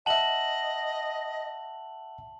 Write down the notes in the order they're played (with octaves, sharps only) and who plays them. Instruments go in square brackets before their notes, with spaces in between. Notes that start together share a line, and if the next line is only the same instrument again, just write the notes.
[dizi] D#5 [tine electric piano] E5 F#5 [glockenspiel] A5 F#7